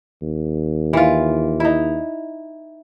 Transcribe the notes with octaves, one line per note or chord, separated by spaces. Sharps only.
D#2
E3 F4
D#4 E4